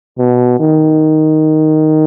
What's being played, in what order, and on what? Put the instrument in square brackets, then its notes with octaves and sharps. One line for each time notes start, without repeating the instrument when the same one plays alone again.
[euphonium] B2
D#3